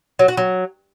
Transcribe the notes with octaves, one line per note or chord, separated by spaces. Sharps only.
F#3
F#4
F#3